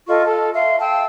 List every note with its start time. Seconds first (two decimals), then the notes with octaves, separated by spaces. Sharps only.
0.08 F4 A4 D#5 C#6
0.26 A4 F6
0.54 E5 F5 C6
0.79 F5 G5 A5 E6